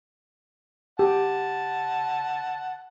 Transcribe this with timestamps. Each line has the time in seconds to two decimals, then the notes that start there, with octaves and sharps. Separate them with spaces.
0.99 G4 F#5 A5